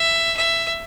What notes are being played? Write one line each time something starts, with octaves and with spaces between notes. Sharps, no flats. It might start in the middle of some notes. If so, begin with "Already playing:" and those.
Already playing: E5
E5